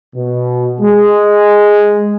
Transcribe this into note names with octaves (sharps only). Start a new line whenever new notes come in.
B2
G#3